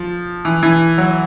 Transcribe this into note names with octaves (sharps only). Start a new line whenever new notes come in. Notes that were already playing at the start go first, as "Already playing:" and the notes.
Already playing: F3
E3
E3
F#3